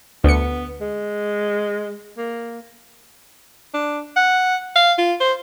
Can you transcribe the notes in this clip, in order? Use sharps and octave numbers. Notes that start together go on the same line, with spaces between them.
D2 B3 C#7
G#3
A#3
D4
F#5
F5
F4
C5